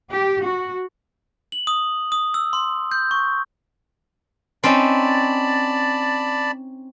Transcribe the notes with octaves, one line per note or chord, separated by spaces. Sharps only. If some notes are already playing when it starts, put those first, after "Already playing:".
G4
F#4
F#7
D#6
D#6
E6
C6
G6
C#6
C4 C#4 D#4 D5 A5 B5